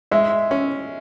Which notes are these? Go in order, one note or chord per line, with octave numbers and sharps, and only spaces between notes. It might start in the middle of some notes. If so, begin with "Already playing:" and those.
G#3 E5
C#4